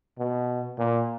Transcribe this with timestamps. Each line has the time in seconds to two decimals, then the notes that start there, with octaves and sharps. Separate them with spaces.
0.19 B2
0.79 A#2